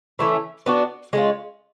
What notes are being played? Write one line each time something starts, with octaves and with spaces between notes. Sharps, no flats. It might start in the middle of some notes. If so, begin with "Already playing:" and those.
E3 A3 C#4
B3 D4 F#4
G#3 C#4 F4